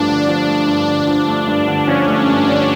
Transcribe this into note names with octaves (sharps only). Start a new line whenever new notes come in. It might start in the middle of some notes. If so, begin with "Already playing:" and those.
Already playing: G2 F3 A3 D4
D3
F3 D4
A3
G2
D3
F3
A3
G2
D3
F3 C#4
A3
G2
D3